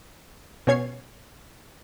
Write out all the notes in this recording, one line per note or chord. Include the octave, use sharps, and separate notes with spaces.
B2 C#4 C#5 G#6 C7